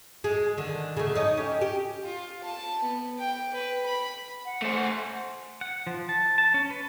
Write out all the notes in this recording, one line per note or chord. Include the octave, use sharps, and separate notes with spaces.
G#3
D3 D#3
C#3 A3
D#4 C#5 D#5
C#4 G4
G4
F4
A5
B3
G5
B4
B5
F#5
A3 C5
F#5
F3
A5
A5
C#4
B4